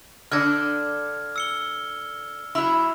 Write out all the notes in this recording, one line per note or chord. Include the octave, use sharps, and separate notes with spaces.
D3 D4 F6 G#6 A#6
E6 C#7 G7
F#3 E4 B5 E6